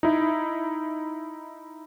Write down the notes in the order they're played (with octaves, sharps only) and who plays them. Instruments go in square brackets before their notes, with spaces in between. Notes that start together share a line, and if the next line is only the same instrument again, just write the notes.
[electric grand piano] D#4 E4